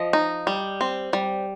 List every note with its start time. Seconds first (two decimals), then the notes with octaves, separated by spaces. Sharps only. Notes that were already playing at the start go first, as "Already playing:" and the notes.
Already playing: F3 D#5
0.13 D#4
0.47 G3
0.81 C4
1.13 G3